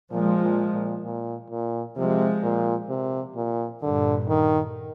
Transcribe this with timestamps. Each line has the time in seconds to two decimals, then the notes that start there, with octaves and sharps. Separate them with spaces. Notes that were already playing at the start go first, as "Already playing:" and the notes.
0.11 A#2 F3 G#3
0.42 A#2
0.73 A#2
1.04 A#2
1.50 A#2
1.96 C3 F3 G#3
2.43 A#2
2.89 C3
3.36 A#2
3.82 G2 A#2 D3
4.28 D#3